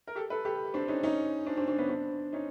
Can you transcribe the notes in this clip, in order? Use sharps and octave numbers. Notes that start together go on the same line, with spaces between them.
A#4
G4 A4
A4 B4
G4 A4
C4 D4
C#4 D#4
C#4 D#4
C4 D4
C4 D4
C4 D4
B3 C#4
C4 D4
C#4 D#4